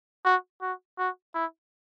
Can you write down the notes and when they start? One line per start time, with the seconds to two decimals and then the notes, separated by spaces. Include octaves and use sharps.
0.25 F#4
0.62 F#4
0.98 F#4
1.34 E4